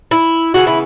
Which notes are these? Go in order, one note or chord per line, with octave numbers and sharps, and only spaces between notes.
E4
C#3 E3 B3 F#4
E4